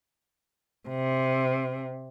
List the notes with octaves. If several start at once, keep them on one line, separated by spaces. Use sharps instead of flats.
C3